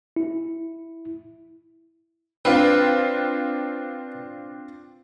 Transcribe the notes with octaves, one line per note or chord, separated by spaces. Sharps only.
E4
C4 D4 F4 B4